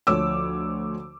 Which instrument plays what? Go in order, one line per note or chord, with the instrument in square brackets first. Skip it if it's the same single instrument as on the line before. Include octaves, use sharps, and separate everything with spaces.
[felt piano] D2 F3 C#5 D6 E6